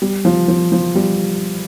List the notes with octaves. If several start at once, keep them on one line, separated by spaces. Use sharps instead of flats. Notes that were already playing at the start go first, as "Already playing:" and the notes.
G3
F3
F3
F3
G3